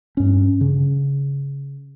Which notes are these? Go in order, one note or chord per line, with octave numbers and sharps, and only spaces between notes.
G2 C#4
C#3